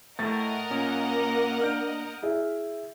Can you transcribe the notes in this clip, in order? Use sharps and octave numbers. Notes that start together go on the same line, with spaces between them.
A2 A3 A#4 D#5 F#5 A6
A#2 A#3 C#4 D#6
D4 F6 G6 D7
E4 G#4 E5